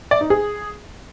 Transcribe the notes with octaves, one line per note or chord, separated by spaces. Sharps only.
D5
D#4
G#4